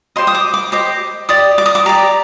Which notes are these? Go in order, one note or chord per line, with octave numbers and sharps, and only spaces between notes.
G4 C5 D#5 C6
D#6
D6
D6
G4 C5 D#5 D6
G4 D5 D#6
D6
D#6
D6
G4 D5 A#5